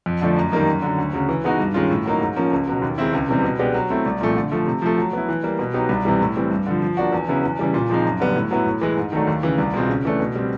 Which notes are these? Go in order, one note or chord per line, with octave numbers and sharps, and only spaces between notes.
F2
D3 F3 A3 D4
F#2
D#3 G3 A#3 D#4
F#2
D3 F#3
D2
C#3 F#3
E3
G#3 B3 D#4 F#4
G2
D#3 G#3 C#4 F4
A2
F#3 A#3 D#4
G#2
F3 A#3 C#4
C#2
B2 F#3
D#2
D#3 G#3 C4 E4
C#2
C3 E3 G3 C4
B2
G#3 B3 D4 G4
F#3
A3 C4 E4
C2
A#2 F3 A3 C4
D3
F3 A3
C3
F3 A3
F#3
B3 E4
E3
G3 A#3
B2
F#3 B3 D#4 G4
C2
C3 E3 G3
A2
E3 G3 C4
G2
D3 F3
F3
A#3 D4 F#4
E2
C#3 F#3 B3 E4
E2
C#3 E3 G3
A#2
F3 G#3 C4 D#4
F#2
D3 G3 B3 D4
A2
F#3 B3 E4
A2
E3 G#3
G#2
D#3 F#3 A3 D4
D#2
C#3 E3
C2
B2 G#3 C4 F4
C#3
E3 A3 D4
B2
G3 C4